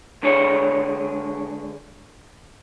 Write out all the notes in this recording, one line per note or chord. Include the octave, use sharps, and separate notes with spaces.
C#2 D3 D4 G#4 C#5